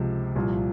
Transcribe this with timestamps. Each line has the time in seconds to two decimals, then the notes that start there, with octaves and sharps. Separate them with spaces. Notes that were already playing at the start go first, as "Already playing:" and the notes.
Already playing: C#2 C3 F3
0.36 C2 A#2 F3